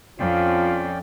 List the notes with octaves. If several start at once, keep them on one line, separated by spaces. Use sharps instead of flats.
F2 F3 C#4 F4 D5 G5